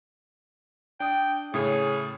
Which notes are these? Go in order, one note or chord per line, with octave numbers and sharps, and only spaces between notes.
D4 G5 D#6
A2 C#3 G#4 C#5